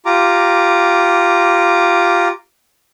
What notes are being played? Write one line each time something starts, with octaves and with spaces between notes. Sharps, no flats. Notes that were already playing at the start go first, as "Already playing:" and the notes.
F4 G4 A#5 D6